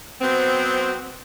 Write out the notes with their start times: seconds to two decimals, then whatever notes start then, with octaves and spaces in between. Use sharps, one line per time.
0.22 F#3 B3 C4